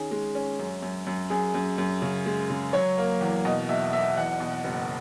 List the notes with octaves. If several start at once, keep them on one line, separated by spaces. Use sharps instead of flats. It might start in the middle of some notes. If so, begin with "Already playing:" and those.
Already playing: D#3 C#4 G#4
G#3
C#4
F#2
F#2
F#2
F#2 G#4
F#2
F#2
C#3
G#3
C#3
F#3 C#5
A#3
E2
B2 D#5
B1 E5
B1 E5
E2 F#5
B2
F#5
F#1